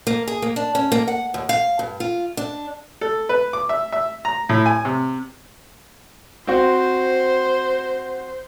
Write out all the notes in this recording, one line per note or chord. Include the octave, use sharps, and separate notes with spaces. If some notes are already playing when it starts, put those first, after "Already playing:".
A#3
G#4
A#3
D4
C#4
A#3
F#5
D#2
F5
G2
F4
D4
A4
B4
D6
E5
E5
A#5
A2
G#5
C3
C4 F#4 C5